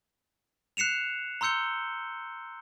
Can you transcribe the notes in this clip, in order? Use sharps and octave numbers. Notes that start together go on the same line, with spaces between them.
F#6 C7 C#7 E7 F7
A#5 C6 E6 G6 C#7 G7